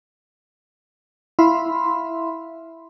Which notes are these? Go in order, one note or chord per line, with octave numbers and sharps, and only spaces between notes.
E4 E5 F5 B5 C6